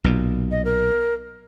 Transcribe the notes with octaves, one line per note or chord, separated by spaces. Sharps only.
B1 A#2
D#5
A#4